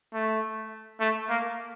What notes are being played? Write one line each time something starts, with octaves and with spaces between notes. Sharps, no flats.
A3
A3
A#3